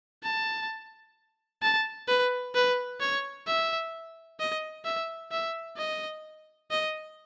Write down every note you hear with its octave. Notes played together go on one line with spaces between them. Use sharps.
A5
A5
B4
B4
C#5
E5
D#5
E5
E5
D#5
D#5